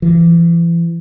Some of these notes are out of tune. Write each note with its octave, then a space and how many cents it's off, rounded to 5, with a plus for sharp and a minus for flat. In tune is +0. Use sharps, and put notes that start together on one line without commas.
E3 +35